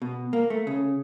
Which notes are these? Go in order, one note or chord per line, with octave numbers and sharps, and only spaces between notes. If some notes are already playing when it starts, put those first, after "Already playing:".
B2
A#3
A3
C#3